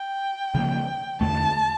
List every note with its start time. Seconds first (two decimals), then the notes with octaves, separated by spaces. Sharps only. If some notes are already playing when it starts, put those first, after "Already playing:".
Already playing: G5
0.55 C#3 F3 A#3
1.21 E2 D3 A3 A5